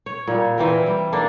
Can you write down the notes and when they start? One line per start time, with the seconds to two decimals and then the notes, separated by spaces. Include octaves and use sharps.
0.06 C#5
0.28 A#2 G3
0.58 E3 C4 A#4
0.86 G3
1.12 A#3 D4 A4 D5